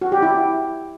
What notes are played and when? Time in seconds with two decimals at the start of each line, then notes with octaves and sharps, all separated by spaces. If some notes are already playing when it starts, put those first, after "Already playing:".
0.01 F#4
0.12 G4
0.22 E4